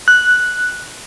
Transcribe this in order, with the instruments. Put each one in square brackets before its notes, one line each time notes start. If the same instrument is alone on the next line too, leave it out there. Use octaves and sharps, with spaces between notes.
[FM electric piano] F#6